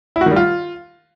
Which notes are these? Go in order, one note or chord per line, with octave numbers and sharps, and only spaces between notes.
E4
F#4
D#3
G3
F4